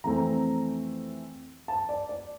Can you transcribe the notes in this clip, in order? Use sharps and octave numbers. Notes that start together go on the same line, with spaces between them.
F2 E3 A3 C4 A#5
A5
D5
D5